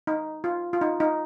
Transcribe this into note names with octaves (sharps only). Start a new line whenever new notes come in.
D#4
F4
F4
D#4
D#4